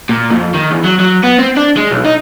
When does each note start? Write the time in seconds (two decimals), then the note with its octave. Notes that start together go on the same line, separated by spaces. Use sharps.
0.09 A#2
0.30 F2
0.54 D#3
0.71 E2
0.84 F#3
1.00 F#3
1.23 B3
1.38 C4
1.57 D4
1.77 G#3
1.91 B1
2.05 D#4